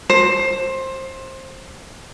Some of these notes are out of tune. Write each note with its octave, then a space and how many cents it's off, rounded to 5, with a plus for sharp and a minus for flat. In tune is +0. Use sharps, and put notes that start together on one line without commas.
C5 +20